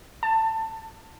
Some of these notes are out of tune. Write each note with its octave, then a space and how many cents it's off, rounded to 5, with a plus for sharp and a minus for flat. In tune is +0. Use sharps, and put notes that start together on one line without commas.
A5 +20